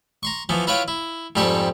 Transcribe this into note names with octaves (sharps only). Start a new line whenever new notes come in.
A#5 C6 C#6
E3 F3 B3
E4 F4 B4 C#5 F5 G5
E4
F2 G#2 G3 G4 A4 C#6